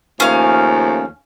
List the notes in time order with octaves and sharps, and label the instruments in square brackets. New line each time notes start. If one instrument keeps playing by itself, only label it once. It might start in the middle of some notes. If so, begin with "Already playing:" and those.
[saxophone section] D#2 F3 A3 [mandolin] C#4 F5